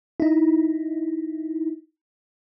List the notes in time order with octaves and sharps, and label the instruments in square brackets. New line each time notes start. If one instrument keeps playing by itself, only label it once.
[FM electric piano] D#4 E4